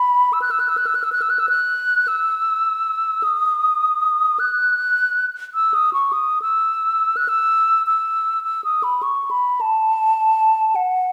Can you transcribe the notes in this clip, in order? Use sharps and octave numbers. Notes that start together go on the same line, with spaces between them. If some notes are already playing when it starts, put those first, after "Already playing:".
Already playing: B5
E6
F#6
E6
F#6
E6
F#6
E6
F#6
E6
F#6
E6
F#6
E6
F#6
E6
D#6
F#6
E6
D#6
C#6
D#6
E6
F#6
E6
E6
E6
D#6
B5
C#6
B5
A5
F#5